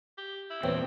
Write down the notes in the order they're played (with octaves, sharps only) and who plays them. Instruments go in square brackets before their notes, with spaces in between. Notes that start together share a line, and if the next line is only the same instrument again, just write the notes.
[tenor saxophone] G4
E4
[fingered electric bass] E2 A#2 [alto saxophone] C4 [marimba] B4 C#5 G5